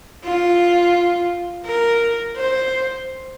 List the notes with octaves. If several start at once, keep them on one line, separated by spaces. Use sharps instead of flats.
F4
A#4
C5